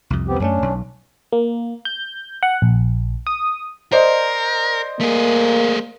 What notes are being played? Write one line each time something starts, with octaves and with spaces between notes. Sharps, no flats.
C2 F2
B3 C4 G4
F#2 G#3 A3 C#4 D4
B1
A#3
G6
F#5
A#1
D#6
A#4 C5 D5 D#5
A3 A#3 G#4